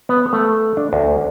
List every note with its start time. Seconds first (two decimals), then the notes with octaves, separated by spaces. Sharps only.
0.09 B3
0.33 A3
0.77 D4
0.93 D2